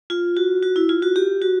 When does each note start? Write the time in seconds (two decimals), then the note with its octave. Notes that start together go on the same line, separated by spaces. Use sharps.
0.10 F4
0.37 F#4
0.63 F#4
0.76 E4
0.89 F4
1.02 F#4
1.16 G4
1.42 F#4